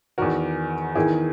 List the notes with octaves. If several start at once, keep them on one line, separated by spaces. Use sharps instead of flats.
E2 D#3 F#4 A#4
E2 D#3 E4 G#4